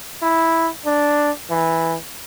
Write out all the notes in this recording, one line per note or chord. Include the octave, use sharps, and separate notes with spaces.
E4
D4
E3